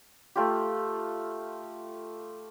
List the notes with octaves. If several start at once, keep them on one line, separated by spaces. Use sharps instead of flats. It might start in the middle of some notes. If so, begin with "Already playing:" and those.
A3 F4 G4